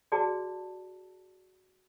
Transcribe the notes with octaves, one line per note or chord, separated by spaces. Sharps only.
F#4 G#4 D5 A5